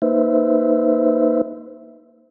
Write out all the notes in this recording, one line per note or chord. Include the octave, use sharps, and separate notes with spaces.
A#3 D#4 B4 C5 E5